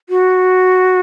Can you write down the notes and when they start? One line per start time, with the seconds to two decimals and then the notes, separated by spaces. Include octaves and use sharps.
0.09 F#4